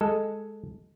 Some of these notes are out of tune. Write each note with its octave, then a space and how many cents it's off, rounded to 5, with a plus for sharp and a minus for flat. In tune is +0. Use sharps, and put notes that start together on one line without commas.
G#3 +0 A4 +0